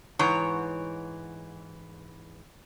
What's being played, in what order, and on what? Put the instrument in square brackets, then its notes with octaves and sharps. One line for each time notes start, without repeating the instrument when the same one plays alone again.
[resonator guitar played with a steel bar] G#2 E3 C#5 A#5